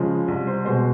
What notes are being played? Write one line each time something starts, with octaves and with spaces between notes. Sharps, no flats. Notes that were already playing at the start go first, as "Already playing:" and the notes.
Already playing: C#3 F3 G#3
C2
C5
B2 G#3 C5